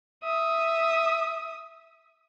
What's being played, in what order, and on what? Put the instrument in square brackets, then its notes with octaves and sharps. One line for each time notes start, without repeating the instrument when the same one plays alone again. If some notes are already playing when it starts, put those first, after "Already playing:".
[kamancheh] E5 D#6